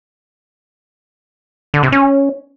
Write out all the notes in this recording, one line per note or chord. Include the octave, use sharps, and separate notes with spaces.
D3
C3
C#4